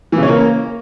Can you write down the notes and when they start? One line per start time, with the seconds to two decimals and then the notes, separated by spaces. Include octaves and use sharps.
0.12 E3
0.17 C#3
0.23 C#4
0.28 A#3